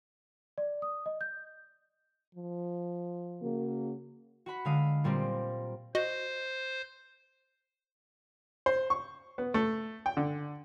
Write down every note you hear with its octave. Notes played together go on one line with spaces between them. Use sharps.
D5
D#6
D#5
G6
F3
C#3 A#3 F#4
F#4 F#5 B5
D3 G#3 F5 D#6
A#2 G3 A#3 C4
F#4 C5 D#5
C5
C#6
B3
A3
G5
D3